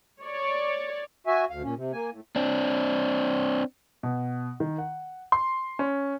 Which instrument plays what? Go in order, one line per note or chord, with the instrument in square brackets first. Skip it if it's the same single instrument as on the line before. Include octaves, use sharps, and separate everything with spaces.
[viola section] C#5 D5
[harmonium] F#4 E5 G#5
D2 F5
A#2 C#4
C3
A#3 G#5
A2
[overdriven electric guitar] C4 D4
[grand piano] B2
D#3
F#5
C6
C#4